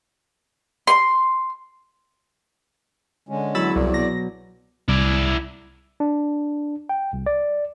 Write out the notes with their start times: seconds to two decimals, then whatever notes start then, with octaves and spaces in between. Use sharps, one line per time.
0.87 C6
3.29 D3 G#3 C#4
3.55 E2 F#3 B5 E6 A6
3.76 C2 D5
3.94 B2 A#6
4.88 C2 E4 D5
6.00 D4
6.89 G5
7.13 C2
7.26 D5